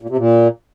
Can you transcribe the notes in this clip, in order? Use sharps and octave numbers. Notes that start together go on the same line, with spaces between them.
A#2
C3
A#2